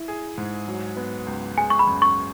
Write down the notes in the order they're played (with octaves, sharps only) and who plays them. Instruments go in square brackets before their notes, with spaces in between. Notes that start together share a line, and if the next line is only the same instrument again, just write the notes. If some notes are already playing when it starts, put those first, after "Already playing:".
Already playing: [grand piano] E4
G#4
G#2
F#3
B3
C#2
[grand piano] G#3 [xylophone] G#5
[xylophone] C#6
B5
[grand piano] F#2
[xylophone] C#6